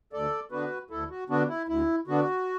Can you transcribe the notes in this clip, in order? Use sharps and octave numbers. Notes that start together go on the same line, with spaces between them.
D2 A4 D5
D3 B3 D4 F#4 B4
D2 E4 A4
F#4
D3 B3 D4 F#4
E4
D2 E4
D3 B3 D4 F#4